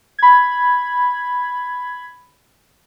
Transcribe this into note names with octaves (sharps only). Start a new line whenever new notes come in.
B5 G#6